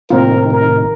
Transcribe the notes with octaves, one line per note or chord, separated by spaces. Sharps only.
A2 C3 D#3 A#3 C4 F4 A#4
A#4